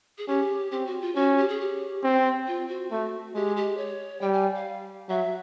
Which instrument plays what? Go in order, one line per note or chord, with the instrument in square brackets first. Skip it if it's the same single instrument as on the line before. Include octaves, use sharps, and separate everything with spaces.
[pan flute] G#4
[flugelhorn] C#4 [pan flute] G4
[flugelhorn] C4 [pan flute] G4
[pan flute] F#4
F4
[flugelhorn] C#4 [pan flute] F#4
[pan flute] G4
G#4
G4
[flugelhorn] C4
[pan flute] F4
F#4
[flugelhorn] A3 [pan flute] F#4
[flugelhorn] G#3 [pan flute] G4
[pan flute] G4
C#5
[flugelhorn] G3 [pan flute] G5
[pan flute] G#5
F5
[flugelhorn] F#3 [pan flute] E5